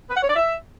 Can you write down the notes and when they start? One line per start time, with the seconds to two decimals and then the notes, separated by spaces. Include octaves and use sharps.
0.10 B4
0.16 F#5
0.23 C#5
0.29 D5
0.36 E5